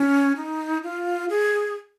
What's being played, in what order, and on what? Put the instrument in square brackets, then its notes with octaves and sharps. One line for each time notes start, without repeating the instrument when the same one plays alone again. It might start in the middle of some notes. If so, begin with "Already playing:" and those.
Already playing: [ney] C#4
D#4
F4
G#4